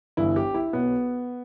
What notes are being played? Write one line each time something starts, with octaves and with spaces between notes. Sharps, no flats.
G1 G2 E3 E4
G4
E4
B1 B2 B3